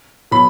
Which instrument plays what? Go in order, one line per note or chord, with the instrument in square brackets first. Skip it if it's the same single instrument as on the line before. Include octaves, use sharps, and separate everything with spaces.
[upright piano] B2 F#3 [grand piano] B5